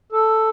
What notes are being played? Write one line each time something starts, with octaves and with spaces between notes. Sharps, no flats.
A4